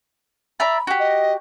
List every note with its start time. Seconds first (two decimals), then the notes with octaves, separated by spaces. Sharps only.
0.60 D5 E5 A#5 B5
0.87 F#4 G4
1.00 D#5